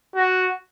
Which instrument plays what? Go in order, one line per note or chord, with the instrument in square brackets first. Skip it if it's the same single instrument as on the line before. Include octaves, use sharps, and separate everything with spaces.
[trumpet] F#4